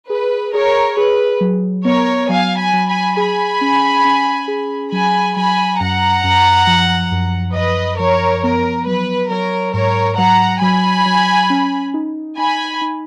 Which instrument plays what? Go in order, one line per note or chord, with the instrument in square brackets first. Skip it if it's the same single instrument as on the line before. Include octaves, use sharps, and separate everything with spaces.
[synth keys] G#4 [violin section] B4
[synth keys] G#4 [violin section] A#4 C#5
[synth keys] G#4 [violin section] B4
[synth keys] F#3
[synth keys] B3 [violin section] A#4 C#5
[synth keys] F#3 [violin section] F5 G#5
[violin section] G#5 B5
[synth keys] F#3
[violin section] G#5 B5
[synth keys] G#4 [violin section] G#5 B5
[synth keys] C#4
C#4
G#4
[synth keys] F#3 [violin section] G#5 B5
[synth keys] F#3 [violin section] G#5 B5
[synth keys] F#2 [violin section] F#5 A#5
[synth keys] F#2
F3
F#2
[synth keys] F#2 [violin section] B4 D#5
[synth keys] F3 [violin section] A#4 C#5
[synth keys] B3 [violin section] A#4
[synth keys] F#3 [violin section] B4
[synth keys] F#3 [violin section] A#4 C#5
[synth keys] G#2 [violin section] A#4 C#5
[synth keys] F#3 [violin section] F#5 A#5
[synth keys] F#3 [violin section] G#5 B5
[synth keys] F#3
C#4
D#4
[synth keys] D#4 [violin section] G#5 B5
[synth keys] D#4